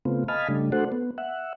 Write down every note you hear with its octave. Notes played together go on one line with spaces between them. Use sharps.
C#3 A3 B3 C4 F4
D#5 F5 G#5 A5 B5 F6
C#3 G3 A3 D4
A3 D4 F#4 A4 C5 F#5
B3
E5 F#5